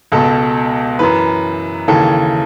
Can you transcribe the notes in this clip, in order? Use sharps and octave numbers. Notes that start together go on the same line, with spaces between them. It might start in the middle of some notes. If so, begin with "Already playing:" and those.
C#2 B2 A4
F#2 E3 B4
D#2 C#3 E3 A4